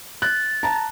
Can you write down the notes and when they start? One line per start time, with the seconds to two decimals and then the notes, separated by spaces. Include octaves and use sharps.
0.22 F#6 A6
0.63 A5 A#5